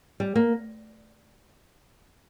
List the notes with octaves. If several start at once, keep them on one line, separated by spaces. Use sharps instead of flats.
G3
A#3